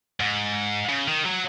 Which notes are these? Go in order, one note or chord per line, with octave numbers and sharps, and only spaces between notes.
G#2
C#3
D#3
F#3